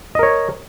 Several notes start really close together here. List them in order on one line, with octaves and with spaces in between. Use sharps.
D#5 A#4 C#5